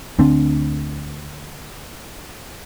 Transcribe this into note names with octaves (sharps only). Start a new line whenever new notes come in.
D2 D3 C4 D4